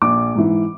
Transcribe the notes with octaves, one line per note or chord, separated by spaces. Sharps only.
A#1 D6
G#2 E3